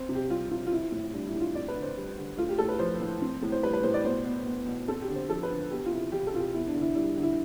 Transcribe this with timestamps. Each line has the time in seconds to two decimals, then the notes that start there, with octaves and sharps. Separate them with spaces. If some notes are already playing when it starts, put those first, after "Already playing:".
Already playing: C4 C5
0.09 C3
0.15 G4
0.29 G3 F4
0.51 C3 F4
0.67 F4
0.72 C4 E4
0.92 A2 E4
1.13 G3 D4
1.27 E4
1.34 A2
1.41 F4
1.55 C4 D5
1.68 B4
1.75 D3
1.82 C5
1.97 G3
2.17 D3
2.37 A3 F4
2.49 G4
2.58 A2 A4
2.69 B4
2.79 F3 C5
3.01 A2
3.22 C4
3.43 A2
3.52 C5
3.63 G3 B4
3.73 B4
3.83 A2 C5
3.94 D5
4.05 B2 C5
4.25 B3
4.46 B3
4.66 B2
4.88 C4 A4
5.02 G4
5.08 D3
5.15 C5
5.29 F3 A4
5.43 B4
5.50 D3
5.71 B3 G4
5.86 F4
5.91 C3 E4
6.12 E3 G4
6.27 A4
6.34 C3 F4
6.40 G4
6.54 B3 E4
6.67 D4
6.75 D3
6.81 E4
6.95 G3 E4
7.17 D3
7.23 E4